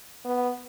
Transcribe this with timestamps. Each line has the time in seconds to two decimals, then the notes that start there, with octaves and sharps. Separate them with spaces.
0.25 B3